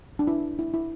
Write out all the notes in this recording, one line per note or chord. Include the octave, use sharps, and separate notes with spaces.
D4
E4
E4
E4